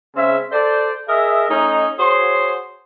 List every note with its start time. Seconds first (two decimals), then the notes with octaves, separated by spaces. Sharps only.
0.16 C#3 G#3 C4 C#4 E5
0.52 A4 C5 D5
1.08 G#4 A#4 D#5 E5
1.50 A3 C#4 D#4
1.99 F#4 G#4 C5 C#5 C6